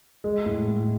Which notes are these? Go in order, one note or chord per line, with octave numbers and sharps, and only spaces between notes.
G#3
A2
A2